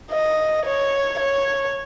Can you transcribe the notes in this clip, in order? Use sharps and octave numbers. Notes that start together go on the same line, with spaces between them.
D#5
C#5
C#5